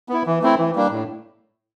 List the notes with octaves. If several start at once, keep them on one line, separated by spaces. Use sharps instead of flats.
B3 E4
E3
A3 C4 E4
E3
G3 A#3 D4
A2